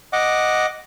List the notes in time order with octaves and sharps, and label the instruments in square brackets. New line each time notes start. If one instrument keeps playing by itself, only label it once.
[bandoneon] D#5 F#5 D6